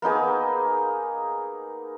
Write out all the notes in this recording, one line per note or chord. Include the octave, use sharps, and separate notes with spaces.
A#3 B3 D#4 G#4